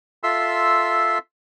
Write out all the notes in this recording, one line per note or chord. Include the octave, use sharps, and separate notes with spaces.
F4 A4 E5 C6 E6